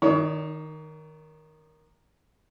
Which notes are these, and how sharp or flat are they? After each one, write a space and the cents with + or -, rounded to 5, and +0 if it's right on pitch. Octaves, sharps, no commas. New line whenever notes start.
D#3 +0 D#4 -45 C#5 +30